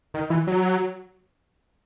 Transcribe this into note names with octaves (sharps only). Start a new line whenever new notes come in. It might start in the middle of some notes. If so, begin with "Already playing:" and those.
D#3
E3
F#3